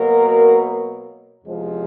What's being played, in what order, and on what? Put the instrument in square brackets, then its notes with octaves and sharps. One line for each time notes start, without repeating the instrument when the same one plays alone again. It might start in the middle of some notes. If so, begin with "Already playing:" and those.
Already playing: [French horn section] B2 F#3 A#3 A#4
E2 C3 F3 G#3